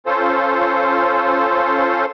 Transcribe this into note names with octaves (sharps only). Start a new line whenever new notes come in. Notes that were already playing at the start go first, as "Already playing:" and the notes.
C#4 F4 A4 C5